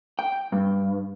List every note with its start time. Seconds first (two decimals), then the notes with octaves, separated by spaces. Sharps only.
0.19 G5
0.52 G2